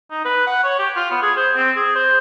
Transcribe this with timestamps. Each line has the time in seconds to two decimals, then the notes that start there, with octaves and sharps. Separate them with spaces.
0.11 D#4
0.25 B4
0.46 F#5
0.64 C#5
0.79 G4
0.96 F4
1.11 B3
1.22 G#4
1.37 C5
1.56 C4
1.76 G#4
1.95 C5